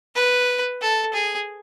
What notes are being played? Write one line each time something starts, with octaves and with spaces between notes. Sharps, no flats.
B4
A4
G#4